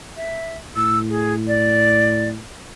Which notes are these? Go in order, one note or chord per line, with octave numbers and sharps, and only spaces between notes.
E5
A2 E6
G#4
D5